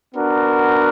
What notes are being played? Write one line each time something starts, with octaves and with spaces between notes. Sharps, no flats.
B3 D4 F#4 A#4